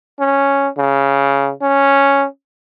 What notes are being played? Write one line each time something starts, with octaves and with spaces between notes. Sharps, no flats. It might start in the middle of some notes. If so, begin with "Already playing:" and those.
C#4
C#3
C#4